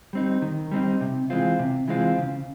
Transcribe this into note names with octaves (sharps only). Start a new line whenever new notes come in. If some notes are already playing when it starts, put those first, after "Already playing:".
G3 C4 D#4
D#3
G3 C4 D#4
C3
E3 G#3 C4 F4
C3
E3 G#3 C4 F4
C#3